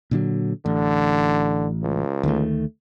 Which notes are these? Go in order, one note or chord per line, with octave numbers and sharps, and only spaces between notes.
A#2 D3 F#3
A1 D3
C#2
D2 D#3 A3